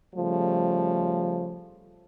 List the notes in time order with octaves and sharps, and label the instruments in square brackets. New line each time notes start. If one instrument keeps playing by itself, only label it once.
[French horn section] C#3 F3 G3 A3